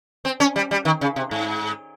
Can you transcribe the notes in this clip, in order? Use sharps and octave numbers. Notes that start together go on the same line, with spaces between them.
C4
C#4
G3
G3
D#3
C#3
C3
G#2